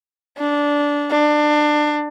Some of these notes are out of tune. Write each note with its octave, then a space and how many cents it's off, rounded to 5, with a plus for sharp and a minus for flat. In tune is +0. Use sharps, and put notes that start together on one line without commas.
D4 -15
D4 +25